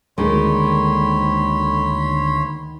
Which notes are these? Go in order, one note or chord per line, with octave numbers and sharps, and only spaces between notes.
D2 D#3 G#3 A#3 C#5 B5 C6